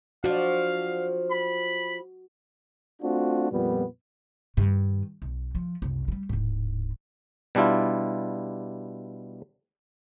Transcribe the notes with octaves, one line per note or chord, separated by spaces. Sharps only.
F3 D4 F#4 F5
B5
A3 C4 D4 F4 F#4
F2 A#2 G3 B3
G2 D#3
B1
F3
F#1 C2
E3 G3
D1 G#2
B2 G3 D4 E4 F4